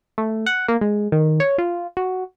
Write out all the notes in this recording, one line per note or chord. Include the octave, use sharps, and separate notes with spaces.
A3
F#5
A#3
G#3
D#3
C#5
F4
F#4